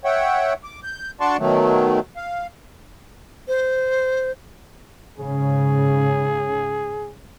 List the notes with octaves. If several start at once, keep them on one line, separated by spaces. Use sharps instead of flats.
C#5 E5 F#5 G5
D6
G6
D4 F#4 D5 A5 C6 C#6
B2 D#3 F#3 A3
F5
C5
G#2 C#3 G#4